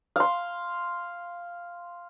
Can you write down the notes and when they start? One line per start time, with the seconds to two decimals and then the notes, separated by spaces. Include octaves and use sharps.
0.16 F5 C6